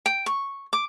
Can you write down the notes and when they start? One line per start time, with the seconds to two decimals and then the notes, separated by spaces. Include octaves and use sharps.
0.06 G5
0.26 C#6
0.73 D6